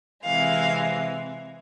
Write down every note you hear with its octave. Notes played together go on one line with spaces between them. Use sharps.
C3 E3 G#3 F5